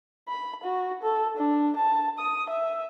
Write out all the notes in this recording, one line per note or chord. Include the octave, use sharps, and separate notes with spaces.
B5
F#4
A4
D4
A5
D#6
E5